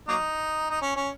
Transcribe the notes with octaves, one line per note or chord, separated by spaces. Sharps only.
F#3 A#3 D#4
D#4
C#4
C#4